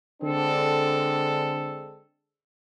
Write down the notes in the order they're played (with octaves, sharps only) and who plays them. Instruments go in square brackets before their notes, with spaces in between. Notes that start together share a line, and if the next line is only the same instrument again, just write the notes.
[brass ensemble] D3 G#3 C4 D4 A4